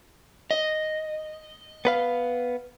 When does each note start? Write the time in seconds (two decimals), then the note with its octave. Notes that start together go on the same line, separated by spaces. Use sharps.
0.51 D#5
1.85 B3 B4 F5